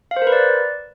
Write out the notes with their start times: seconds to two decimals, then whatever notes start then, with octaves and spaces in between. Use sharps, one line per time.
0.11 F5
0.16 C5
0.22 A#4
0.27 B4
0.32 D5